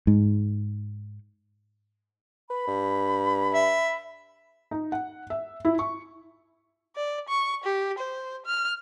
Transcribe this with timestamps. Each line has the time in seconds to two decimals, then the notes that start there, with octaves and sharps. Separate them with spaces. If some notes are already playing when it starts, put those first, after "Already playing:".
0.07 G#2
2.50 B4 B5
2.67 G2
3.54 E5
4.71 D#4
4.92 F#5
5.30 E5
5.65 E4
5.79 C#6
6.95 D5
7.28 C#6
7.64 G4
7.98 C5
8.46 F6